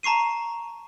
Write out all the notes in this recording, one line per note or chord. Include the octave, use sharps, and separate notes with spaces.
A5 A#5 C#6 C7 D#7